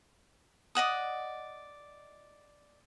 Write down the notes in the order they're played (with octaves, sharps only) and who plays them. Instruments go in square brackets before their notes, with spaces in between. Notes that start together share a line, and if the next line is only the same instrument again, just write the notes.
[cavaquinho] D5 D#5 F#5 D#6